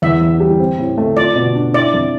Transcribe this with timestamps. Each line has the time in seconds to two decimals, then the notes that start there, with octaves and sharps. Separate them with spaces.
0.02 E2 E5
0.22 E2
0.40 G3
0.60 C4
0.78 A2
0.98 A3
1.17 F4 D5
1.36 B2
1.55 D4
1.74 E4 D5
1.94 F2